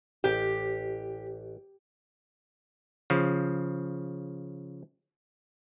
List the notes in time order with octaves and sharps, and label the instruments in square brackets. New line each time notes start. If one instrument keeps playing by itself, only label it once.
[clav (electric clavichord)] A1 [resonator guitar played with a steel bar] G4
[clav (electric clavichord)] C#3 F3